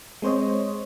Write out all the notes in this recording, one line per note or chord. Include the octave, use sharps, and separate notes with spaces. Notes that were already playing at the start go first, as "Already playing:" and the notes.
G#3 C4 C5 C#5 D#5